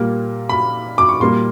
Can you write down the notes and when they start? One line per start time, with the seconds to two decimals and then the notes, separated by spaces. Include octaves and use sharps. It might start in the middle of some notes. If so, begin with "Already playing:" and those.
Already playing: A#2 G3 A#3
0.49 B5
0.98 D6
1.09 C#6
1.20 A#2 G3 A#3 C6